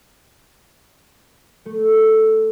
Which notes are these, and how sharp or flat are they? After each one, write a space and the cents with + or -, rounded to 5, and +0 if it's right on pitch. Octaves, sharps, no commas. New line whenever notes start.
A3 +0 A4 +0